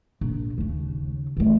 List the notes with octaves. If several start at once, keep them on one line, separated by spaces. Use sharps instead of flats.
A#1
D#2 C#3
E3 A3